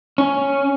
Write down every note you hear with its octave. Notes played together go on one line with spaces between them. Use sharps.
C#4